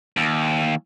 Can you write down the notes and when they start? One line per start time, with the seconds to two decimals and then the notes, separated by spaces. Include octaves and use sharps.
0.17 D#2